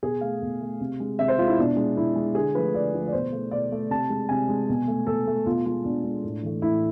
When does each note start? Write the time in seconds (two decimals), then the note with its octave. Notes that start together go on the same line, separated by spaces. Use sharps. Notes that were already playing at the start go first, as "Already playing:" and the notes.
0.02 B2 G#4
0.21 A3 F5
0.42 B2
0.61 A3
0.80 C3
1.00 G#3
1.19 C3 E5
1.28 C5
1.38 G#3 F4
1.48 E4
1.57 B2 D4
1.76 G#3
1.97 B2 E4
2.16 G#3
2.35 D3 G#4
2.55 F3 A3 B4
2.74 D3 D5
2.94 F3 A3
3.07 D5
3.12 B2 C5
3.32 A3
3.51 B2 D5
3.72 A3
3.90 C3 A5
4.10 G#3
4.29 C3 G#5
4.48 G#3
4.69 B2
4.88 A3
5.06 B2 A4
5.27 A3
5.46 B2 F4
5.65 G#3 F4
5.84 B2 D4
6.04 G#3
6.23 A2
6.42 E3 A3
6.62 A2 E4